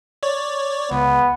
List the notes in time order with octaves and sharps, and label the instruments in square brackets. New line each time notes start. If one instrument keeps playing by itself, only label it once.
[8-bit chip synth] C#5 D5
[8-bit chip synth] C#2 [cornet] B3